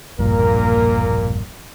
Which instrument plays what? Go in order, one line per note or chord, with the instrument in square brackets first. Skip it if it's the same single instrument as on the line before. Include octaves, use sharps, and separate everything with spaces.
[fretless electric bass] E1 A#1 G2 [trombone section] A#2 A#3 A#4